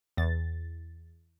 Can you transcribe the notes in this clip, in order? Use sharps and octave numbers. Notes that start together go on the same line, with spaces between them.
E2 A6